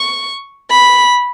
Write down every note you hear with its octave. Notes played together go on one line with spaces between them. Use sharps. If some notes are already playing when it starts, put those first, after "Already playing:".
Already playing: C#6
B5